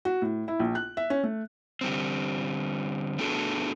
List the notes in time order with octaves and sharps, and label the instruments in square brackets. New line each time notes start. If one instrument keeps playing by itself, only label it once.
[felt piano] F#4
A2
E4
A#1
F#6
E5
C#4
A3
[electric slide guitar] D3 G3 C4
A3 B3 D4 F#4 G#4 A4